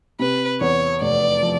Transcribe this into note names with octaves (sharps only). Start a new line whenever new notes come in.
C3 B4
E2 C#5
F1 D5
F3